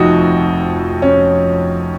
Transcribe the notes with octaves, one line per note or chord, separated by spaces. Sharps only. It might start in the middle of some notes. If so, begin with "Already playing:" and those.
Already playing: F1 F2 D#4 F#4
C#4